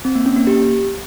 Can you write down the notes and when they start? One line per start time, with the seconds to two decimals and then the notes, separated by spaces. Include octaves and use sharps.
0.05 C4
0.15 A#3
0.26 C#4
0.37 A#3
0.47 G4